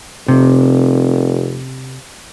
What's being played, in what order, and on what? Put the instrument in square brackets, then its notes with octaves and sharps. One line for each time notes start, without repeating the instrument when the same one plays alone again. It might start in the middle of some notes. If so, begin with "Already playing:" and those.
[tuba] F1 [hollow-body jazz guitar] C3